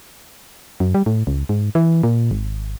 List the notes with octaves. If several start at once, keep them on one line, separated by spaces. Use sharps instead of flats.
F#2
G3
A2
C#2
G#2
E3
A#2
G#1